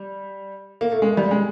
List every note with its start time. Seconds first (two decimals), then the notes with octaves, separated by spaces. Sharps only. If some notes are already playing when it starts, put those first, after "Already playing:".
Already playing: G3
0.81 A#3
0.91 A3
1.02 G#3
1.17 G3
1.31 G#3